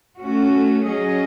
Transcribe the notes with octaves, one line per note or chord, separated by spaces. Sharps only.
A3 C#4 F#4
F#3 C#4 G#4 D#5